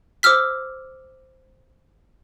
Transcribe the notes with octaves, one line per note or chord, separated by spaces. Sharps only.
C5 D6 E6 F6 B6